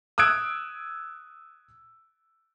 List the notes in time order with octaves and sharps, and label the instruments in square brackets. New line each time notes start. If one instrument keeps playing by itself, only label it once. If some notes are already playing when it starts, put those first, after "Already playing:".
[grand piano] D#6 E6 F#6 G#6 D7